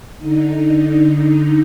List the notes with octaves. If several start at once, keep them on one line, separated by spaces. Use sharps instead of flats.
D3 D#4